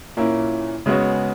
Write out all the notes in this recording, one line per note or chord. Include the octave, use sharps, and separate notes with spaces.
A#2 A#3 C#4 E4
C#3 G#3 B3 F#4 C#5